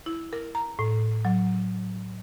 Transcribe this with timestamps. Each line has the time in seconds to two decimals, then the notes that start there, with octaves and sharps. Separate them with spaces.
0.06 E4
0.33 A#4
0.55 A#5
0.79 A2
1.25 F#3